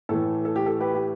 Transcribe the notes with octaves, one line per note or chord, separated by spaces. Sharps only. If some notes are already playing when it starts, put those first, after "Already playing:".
A2 E3 A3 A4
A4
G4
A4
G4 B4
G4